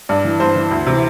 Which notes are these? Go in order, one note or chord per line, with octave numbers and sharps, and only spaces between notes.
G2 D5
E3
G2 C5
E3
D2
C3 E3